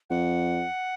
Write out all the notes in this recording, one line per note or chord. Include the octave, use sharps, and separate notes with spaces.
F2 F#5